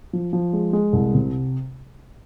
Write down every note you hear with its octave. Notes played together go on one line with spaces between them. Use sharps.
F3
F3
G#3
G#3
C2
C3